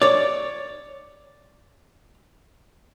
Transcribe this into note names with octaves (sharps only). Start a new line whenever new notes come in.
C#5 D5